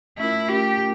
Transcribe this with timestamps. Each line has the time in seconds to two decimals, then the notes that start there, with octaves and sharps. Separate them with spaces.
0.18 A3 C#4 E4 F4 A#4
0.48 A3 C#4 F4 G4 A#4
0.78 A3